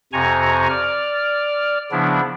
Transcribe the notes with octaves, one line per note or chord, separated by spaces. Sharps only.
F2 C3 G#5 A#5 C#6
D5 F6
C#3 F3 B3 D4 E4